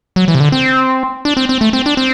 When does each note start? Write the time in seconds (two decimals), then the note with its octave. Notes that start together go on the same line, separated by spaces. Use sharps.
0.16 F#3
0.28 E3
0.35 C3
0.40 D3
0.52 C4
1.25 D4
1.37 C4
1.49 C4
1.61 A3
1.73 C4
1.86 D4
1.97 C4